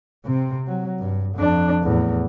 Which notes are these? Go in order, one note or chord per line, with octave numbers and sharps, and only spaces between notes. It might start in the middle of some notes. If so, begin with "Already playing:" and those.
C3 C4
F#3
G2
F2 D4
E2 A2